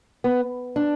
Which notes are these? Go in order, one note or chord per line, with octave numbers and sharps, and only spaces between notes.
B3
D4